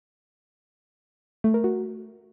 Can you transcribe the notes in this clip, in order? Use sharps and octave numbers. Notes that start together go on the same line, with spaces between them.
A3
A#4
F#4